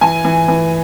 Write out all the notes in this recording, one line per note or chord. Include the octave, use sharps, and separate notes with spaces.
E3 G#5
E3
E3